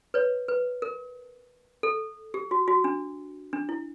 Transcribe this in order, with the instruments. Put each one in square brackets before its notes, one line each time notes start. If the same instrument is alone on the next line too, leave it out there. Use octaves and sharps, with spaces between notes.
[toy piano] B4 C#5
B4
A#4
A4
G4
F#4
F#4
D4
D4
E4